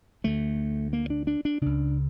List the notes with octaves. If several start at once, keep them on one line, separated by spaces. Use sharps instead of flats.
D2 D3 A3
A#3
D4
D4
D4
C#2 C#3 D4